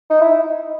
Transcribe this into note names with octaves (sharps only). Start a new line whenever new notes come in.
D#4
E4